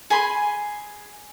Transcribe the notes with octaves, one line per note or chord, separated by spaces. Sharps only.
G#4 G#5 B5 C6